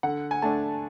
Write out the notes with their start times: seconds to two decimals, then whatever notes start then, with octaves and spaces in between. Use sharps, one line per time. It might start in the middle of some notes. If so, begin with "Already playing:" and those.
0.03 D3 F#5
0.31 G#5
0.42 A3 D4 A5